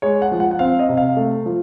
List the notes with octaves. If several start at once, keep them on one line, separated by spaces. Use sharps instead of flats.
G#3 C#5
F#5
F3
F#5
F#5
C4 F5
D#5
C3
F5
A3
F3